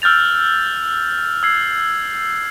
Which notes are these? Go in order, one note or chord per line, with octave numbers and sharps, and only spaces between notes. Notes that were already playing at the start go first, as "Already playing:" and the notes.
E6 F6 G6 A6 F7
E6 G#6 C7